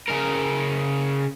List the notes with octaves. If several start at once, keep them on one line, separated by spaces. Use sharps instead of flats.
C#3 A#4